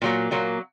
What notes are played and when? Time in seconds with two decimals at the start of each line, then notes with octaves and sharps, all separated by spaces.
0.02 A#2 F#3 A#3
0.31 A#2 F#3 A#3